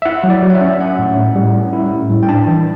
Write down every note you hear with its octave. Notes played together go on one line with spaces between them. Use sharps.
E5
E4 F#5
F#3
D5
F#3
F#5
E5
C#4
C#4 F#5
A2
A2
G3
C#4
E4
A2
G3
G5
D4 A5
E3